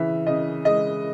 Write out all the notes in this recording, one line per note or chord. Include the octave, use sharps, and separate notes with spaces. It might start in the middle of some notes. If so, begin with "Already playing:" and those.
Already playing: C#3 E3 E5
C#3 D#5
G#3 D#5